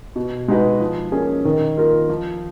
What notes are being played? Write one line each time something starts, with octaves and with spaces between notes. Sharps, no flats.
B2
G#3 D#4 F#4 B4
F3
A#3 C#4 G#4
D#3
A#3 F4 A#4
F3